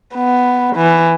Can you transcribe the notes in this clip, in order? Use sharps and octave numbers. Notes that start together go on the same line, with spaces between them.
B3
E3